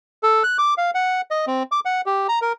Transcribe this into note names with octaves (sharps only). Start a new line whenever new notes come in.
A4
F#6
D6
F5
F#5
D#5
C4
D6
F#5
G4
A#5
A#4